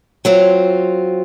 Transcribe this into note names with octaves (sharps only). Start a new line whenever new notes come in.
F#3 C4 F4